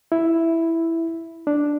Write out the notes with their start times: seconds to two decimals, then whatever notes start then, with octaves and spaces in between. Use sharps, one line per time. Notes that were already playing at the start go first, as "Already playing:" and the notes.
0.12 E4
1.47 D4